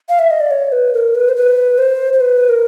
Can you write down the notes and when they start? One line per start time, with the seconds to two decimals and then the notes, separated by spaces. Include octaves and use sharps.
0.09 F5
0.19 E5
0.31 D#5
0.41 D5
0.51 C#5
0.72 B4
0.94 A#4
1.15 B4
1.28 C5
1.36 B4
1.78 C5
2.13 C5
2.20 B4
2.49 A#4